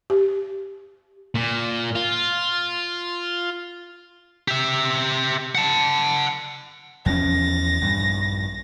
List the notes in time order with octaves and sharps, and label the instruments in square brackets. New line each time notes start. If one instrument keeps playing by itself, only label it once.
[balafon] G4
[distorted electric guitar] A#2
F4
G4 E5
F#5 A5
[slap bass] E2 F3 C#4 [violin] A6 A#6
[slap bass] A#1 G2